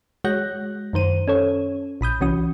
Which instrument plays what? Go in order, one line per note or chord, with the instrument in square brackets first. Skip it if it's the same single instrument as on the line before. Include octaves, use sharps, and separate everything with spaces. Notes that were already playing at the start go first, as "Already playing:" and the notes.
[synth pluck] G#3 F#4 C#5 F#6 G6 A#6
F#2 D#3 C5 D#7
C#4 A4 C#5
A#1 B5 D#6 G6
C2 E3 C#4 F#4 D#6